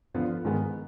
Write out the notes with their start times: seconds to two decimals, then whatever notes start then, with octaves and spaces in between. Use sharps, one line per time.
0.14 D3 F3 B3 F4
0.45 G#2 D#3 G#3 B3